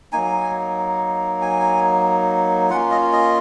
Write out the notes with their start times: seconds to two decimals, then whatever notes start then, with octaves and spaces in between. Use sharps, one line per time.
0.12 F#3 A#3 D#4 G#5
1.41 G#5
2.70 A#3 C#4 F4 F#5
2.91 D#5
3.12 D#5